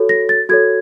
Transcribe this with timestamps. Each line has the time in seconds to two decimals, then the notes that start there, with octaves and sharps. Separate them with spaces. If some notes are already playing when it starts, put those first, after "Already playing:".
Already playing: F#4 A4 C#5
0.09 A#6
0.29 A6
0.49 F#4 A4 C#5 G#6